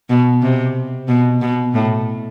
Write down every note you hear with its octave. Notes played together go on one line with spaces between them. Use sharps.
B2
C3
B2
B2
A2